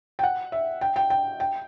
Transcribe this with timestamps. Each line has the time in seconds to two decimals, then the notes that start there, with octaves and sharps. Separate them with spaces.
0.19 G5
0.23 F#5
0.52 E5
0.81 G5
0.96 G5
1.10 G5
1.40 G5